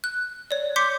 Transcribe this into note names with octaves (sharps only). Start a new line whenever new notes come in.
F#6
C#5 D5
C6 D6 G6 B6 C#7